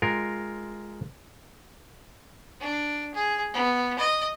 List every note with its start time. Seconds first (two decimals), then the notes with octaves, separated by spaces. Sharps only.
0.02 G#3 F4 A#4 G5
2.60 D4
3.14 G#4
3.53 B3
3.98 D#5